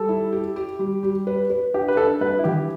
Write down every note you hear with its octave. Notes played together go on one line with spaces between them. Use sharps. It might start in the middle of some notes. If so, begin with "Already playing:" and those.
Already playing: G3 A4
E4
G4
G4
G3
G3
B4
B4
D4 G4
B4
D4 A4
G2 B4
E4
E3 G4